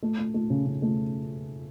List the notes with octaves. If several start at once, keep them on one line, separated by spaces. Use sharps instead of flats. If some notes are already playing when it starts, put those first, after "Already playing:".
A3
A3
A3
C#3
C#3
A3